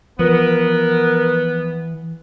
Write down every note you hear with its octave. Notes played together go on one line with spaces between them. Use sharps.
E3 F3 B3 A#4